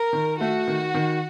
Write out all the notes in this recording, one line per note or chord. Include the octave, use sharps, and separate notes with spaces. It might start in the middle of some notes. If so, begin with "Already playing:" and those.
Already playing: A#4
D#3
A3 F#4
D#3
D#3